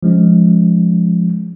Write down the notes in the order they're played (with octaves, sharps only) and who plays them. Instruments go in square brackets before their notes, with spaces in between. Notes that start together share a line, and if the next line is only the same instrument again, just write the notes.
[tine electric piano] F3 G#3 C#4